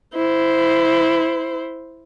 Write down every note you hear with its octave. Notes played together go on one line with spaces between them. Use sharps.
E4 C5